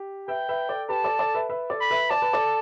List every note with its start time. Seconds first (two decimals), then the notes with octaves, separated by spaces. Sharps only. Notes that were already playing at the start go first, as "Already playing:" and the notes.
Already playing: G4
0.28 B4 E5 G5
0.49 B4 E5
0.69 A4 D5
0.89 G4 B4 A5
1.04 A4 D5
1.19 A4 D5
1.35 B4 E5
1.49 B4 E5
1.70 A4 D5
1.81 B5
1.91 B4 E5
2.10 D5 A5
2.22 B4
2.33 A4 D5